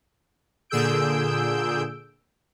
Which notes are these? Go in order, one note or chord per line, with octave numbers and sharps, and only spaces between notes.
A#2 D3 G#4 E6 G6 D7